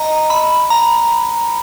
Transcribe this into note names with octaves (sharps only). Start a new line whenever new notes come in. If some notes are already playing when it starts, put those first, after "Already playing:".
Already playing: D#5 A#5
B5
A#5